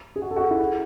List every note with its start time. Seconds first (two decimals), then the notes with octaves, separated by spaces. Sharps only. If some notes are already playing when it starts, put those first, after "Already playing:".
0.16 G#4
0.22 F#4
0.31 A4
0.36 F#4
0.41 G#4
0.51 E4
0.60 F#4